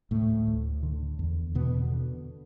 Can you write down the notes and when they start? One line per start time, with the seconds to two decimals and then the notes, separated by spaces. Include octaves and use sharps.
0.11 D2 A2 A3
0.47 D2
0.83 D3
1.19 E2
1.55 B2 D3 B3
1.91 D3